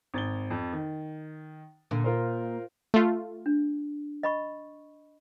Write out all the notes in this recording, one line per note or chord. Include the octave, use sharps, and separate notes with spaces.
G#1 A6 G7
F2
D#3
A#2 D3
F4 A#4 C5
A3 F4
D4
D#5 B5 C#6